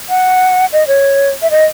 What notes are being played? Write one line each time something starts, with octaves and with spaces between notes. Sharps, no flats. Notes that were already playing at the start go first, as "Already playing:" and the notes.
F#5
D#5
C#5
E5
D#5